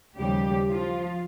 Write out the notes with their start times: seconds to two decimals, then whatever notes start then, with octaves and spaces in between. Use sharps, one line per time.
0.17 D#2 C#3 F3 G3 G4
0.68 F3 F4